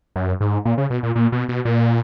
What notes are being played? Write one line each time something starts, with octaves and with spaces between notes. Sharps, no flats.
F#2
G#2
A#2
C#3
B2
A#2
A#2
B2
B2
A#2